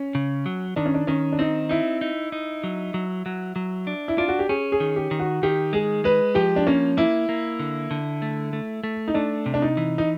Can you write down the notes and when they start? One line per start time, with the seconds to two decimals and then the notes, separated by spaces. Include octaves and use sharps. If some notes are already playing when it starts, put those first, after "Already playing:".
Already playing: C#4
0.15 C#3
0.46 F#3
0.76 D#3 D4
0.86 C#4
0.94 D4
1.07 D#3 C#4
1.32 D4
1.39 C4 D#4
1.69 D#4 E4
2.01 D#4
2.32 D#4
2.64 F#3
2.94 F#3
3.26 F#3
3.56 F#3
3.87 D4
4.08 E4
4.18 D4 F4
4.28 F#4
4.39 G4
4.49 C#4 G#4
4.72 G#4
4.80 D#3
4.96 G4
5.11 D#3
5.20 F#4
5.43 D#3 G4
5.73 G#3 G#4
6.04 G#3 B4
6.35 F3 G4
6.56 D4
6.67 A#3 C#4
6.97 A#3 E4
7.29 A#3
7.59 D3
7.91 D3
8.22 A3
8.53 A3
8.84 A3
9.08 D#4
9.14 A3 D4
9.46 C3
9.54 D4
9.62 D#4
9.77 E3
9.98 D#4